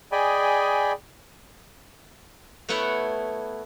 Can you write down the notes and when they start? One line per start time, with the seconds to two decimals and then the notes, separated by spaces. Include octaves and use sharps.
0.12 G#4 D5 D#5 G5 G#5 B5
2.69 A3 B3 E4 C#5 F#5